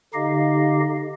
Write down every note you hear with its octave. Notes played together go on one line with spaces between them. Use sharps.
D3 D#4 G4 D#5 F5